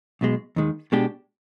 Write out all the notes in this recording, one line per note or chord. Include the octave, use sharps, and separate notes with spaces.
B1 B2 G#3
D#2 D#3 G#3
B2 G#3 D4 G4